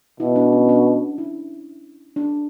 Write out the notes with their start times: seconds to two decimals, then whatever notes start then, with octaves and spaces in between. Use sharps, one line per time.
0.20 B2 E4
0.36 D4
0.52 C#4
0.69 D4
1.18 E4
2.16 D4